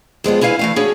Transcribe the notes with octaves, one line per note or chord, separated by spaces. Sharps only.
F2 G#3 B3 F4
C#4 E4 B4 F5 G5 G#5
E3 A3 F5
C#4 D4 F#4 G#4 C#5